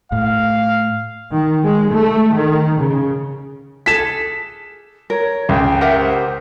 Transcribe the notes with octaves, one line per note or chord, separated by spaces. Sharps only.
A2 F5
D#3
G#3
A3
D#3
C#3
G#4 A4 B6 E7
A#4 C#5
C#2 G5
G4 A#4 E5 F#5
C5